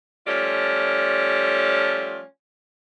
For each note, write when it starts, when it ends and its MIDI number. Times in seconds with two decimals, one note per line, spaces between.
0.27 2.21 53
0.27 2.21 55
0.27 2.21 57
0.27 2.21 61
0.27 2.21 65
0.27 2.21 74